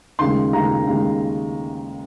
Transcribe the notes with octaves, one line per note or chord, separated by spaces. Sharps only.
D#2 C#3 G#3 C6
D#2 C#3 G#3 A#5
D#2 C#3 G#3